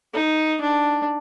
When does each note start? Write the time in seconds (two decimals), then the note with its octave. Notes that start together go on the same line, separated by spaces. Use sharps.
0.13 D#4
0.61 D4